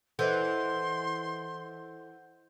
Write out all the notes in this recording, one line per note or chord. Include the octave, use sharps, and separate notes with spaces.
E3 A4 C5 D#5 F#5 C6 G6